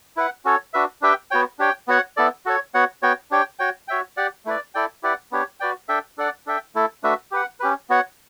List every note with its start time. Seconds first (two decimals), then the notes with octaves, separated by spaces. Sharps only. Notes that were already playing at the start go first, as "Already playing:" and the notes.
0.16 E4 B4 F#5
0.45 C#4 F#4 A4 C#5
0.73 D4 F#4 B4 E5
1.02 D4 G4 B4 E5 G5
1.31 B3 F#4 C#5 G5
1.59 D4 G4 C#5 G5
1.88 B3 F#4 C#5 F#5
2.17 B3 E4 A4 D5
2.45 F#4 A4 C#5
2.74 B3 F#4 C#5 F#5
3.03 B3 F#4 C#5 G5
3.31 D4 G4 C#5 G5
3.59 F#4 C#5 G5
3.88 F#4 C#5 E5 G5
4.17 G4 D5 F#5
4.45 A3 E4 B4 D5
4.75 E4 A4 D5 G5
5.03 E4 G4 B4 D5 F#5
5.32 B3 D4 G4 C#5
5.60 F#4 B4 D5 G5
5.88 D4 A4 E5 G5
6.18 D4 A4 D5 F#5
6.46 D4 A4 E5 G5
6.75 A3 E4 A4
7.03 A3 D4 F#4 B4 E5
7.31 G4 B4 F#5
7.60 C#4 G4 B4
7.90 B3 F#4 C#5 F#5